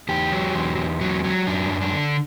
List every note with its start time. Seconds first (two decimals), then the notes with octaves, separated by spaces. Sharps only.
0.09 E2 G4
0.32 F#3
0.54 E2
0.77 E2
1.01 F#3
1.24 F#3
1.47 F#2 D4
1.70 F#2
1.81 D4
1.92 D3